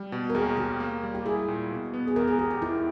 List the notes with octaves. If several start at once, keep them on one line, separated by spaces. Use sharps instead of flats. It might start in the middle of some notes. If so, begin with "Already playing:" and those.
Already playing: G3
B2
A#4
D#2 G#4
D#2 G4
A#3
G3
G4
E4 G#4
A#2
B2
B3
G#4
E2 A#4
G#4
E2 G4
G4
D#3 E4